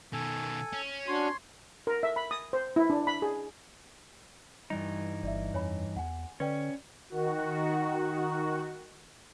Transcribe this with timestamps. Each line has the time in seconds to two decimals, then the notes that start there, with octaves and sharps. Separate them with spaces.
0.13 B2 D#3 A4 G#5
0.73 C#4
1.08 D4 F#4 C#5 C6
1.87 A#4
2.03 E5
2.16 B5
2.31 D#6
2.53 C5
2.76 E4
2.90 D4
3.07 B5
3.22 G#4
4.70 G2 E3 G3 D#4
5.23 G1 D5 E5
5.54 F2 C#5 G#5 B5
5.96 E2 F#5 G#5
6.40 D3 C#4 B4 D5 G5
7.10 D#3 F#4